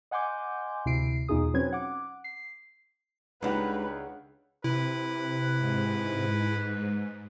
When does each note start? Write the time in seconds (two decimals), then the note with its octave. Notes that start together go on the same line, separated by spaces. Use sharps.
0.11 D#5 F#5 G#5 C6 D6 G6
0.85 D2 C3 E4 C7 D7
1.28 E2 B2 D#4 F4 G#4 D#6
1.54 F#3 C4 C#4 B4 G#6
1.73 F#5 D6
2.24 C7
3.42 C#2 C#3 G#3 D4 D#4 G4 B4 F#5
4.64 C3 E4 B4
5.56 G#2